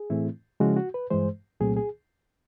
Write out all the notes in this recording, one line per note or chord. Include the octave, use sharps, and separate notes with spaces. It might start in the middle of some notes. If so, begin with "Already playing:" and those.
Already playing: G#4
A2 E3 A3 C4 E4
C#3 F3 G#3 C#4 E4 F#4
F#4
B4
G2 E3 G#3 C5
C2 A#2 F#3 A3 C4 G#4
G#4